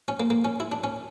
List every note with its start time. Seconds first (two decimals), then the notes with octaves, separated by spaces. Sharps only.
0.08 C#4
0.20 A#3
0.30 A#3
0.45 C#4
0.60 E4
0.72 D4
0.84 C#4